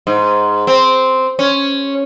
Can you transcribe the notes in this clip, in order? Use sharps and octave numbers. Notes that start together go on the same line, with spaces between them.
G#2
C4
C#4